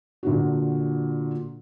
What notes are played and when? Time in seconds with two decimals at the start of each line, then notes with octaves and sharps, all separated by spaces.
0.23 A#2 D3 F#4